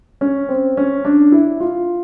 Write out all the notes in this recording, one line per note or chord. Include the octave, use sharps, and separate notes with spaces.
C#4
C4
C#4
D4
E4
F4